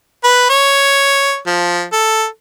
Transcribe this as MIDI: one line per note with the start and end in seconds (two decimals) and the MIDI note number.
0.24 0.50 71
0.50 1.39 73
1.47 1.85 53
1.93 2.26 69